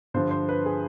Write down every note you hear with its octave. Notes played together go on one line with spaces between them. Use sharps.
G2 D3 F3 C5
C5
B4
G#4